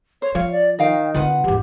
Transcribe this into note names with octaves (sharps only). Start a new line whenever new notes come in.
C5 C#5
F3 C#5 F5
D5
D#3 D#5 F5 G5
D3 C4 F4 B4 F#5
G#1 E2 G4